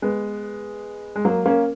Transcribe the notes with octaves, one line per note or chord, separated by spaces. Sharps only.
G#3 B3
G#3
F#3 A#3
A#3 C#4